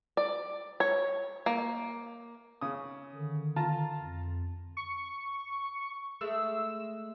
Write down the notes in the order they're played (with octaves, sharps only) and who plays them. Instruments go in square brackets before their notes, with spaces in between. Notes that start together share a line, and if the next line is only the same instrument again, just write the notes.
[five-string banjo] D5
C#5
A#3
[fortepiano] C#3 D#6
[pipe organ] D3 D#3
[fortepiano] F4 A5 A#5
[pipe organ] F2
[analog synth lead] C#6
[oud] G#3 A3 [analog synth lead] E6